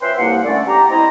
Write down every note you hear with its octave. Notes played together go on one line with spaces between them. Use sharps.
F3 C#4 B4 E5 G5 C6
C2 A#3 F#5
D3 E3 A3 C#4 A4 D5
G4 A#5
C4 E4 D#5 A#5